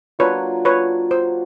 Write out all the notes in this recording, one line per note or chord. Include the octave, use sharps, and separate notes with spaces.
F#3 A#3 D4 F4 B4 C#5
B4 C#5
C5